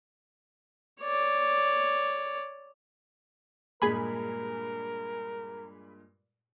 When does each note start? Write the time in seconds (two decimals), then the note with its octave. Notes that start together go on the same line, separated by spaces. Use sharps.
1.01 C#5 D5
3.82 G2 A#2 G#3 G#4 A#4 G#5 B5